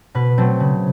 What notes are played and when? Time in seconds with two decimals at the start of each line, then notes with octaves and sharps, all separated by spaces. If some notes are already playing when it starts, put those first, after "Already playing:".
0.15 B2 B4
0.38 F#3 A3 C4
0.60 C#3